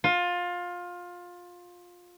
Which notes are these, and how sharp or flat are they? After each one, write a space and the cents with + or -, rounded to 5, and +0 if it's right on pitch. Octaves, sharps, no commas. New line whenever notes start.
F4 +20